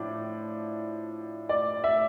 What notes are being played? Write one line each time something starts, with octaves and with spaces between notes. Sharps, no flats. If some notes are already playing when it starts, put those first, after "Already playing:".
Already playing: A2 F3 D4 D5
D5
E5